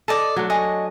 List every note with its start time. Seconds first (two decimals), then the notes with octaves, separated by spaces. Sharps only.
0.08 A4 D5 D#5 A5
0.36 F#3 A3 D4
0.50 D#5 G#5 C#6